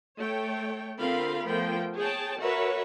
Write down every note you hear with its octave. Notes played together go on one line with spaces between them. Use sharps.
A3 C#5 G5
D3 C4 F4 A#4 F5 B5
F3 A3 B3 A#4 G5
G#4 C#5 G5 A5
F#4 A#4 B4 C#5 E5